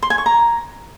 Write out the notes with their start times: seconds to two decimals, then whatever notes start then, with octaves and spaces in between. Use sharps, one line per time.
0.02 C6
0.10 G#5
0.18 C#6
0.26 A#5